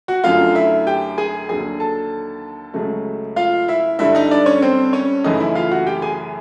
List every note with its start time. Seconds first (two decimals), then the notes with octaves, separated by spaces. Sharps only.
0.08 F#4 F#5
0.24 F#2 D3 F#3 A3 F4 F5
0.55 E4 E5
0.87 G4 G5
1.18 G#4 G#5
1.49 D#2 D3 F#3 G#4 G#5
1.80 A4 A5
2.74 C#2 C#3 F#3 A3
3.36 F4 F5
3.68 E4 E5
3.99 G2 D3 G3 E4 E5
4.15 D#4 D#5
4.31 D4 D5
4.46 C#4 C#5
4.62 C4 C5
4.93 C#4 C#5
5.24 F#2 C#3 E3 A3 D#4 D#5
5.40 E4 E5
5.55 F4 F5
5.71 F#4 F#5
5.87 G4 G5
6.02 G#4 G#5